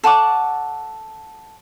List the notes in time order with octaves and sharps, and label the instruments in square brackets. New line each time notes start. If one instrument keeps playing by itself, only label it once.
[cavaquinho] A4 F#5 C#6 D6